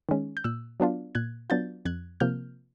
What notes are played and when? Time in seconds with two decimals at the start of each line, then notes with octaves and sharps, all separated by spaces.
0.09 D#3 G#3 C#4
0.37 G6
0.44 A#2 E6 F#6
0.80 F#3 B3 D4 F4
1.15 A#2 F#6 G#6
1.50 F#3 B3 D4 F4 G6 A6
1.85 F2 F#6 G#6
2.20 C3 F3 A#3 F6 G6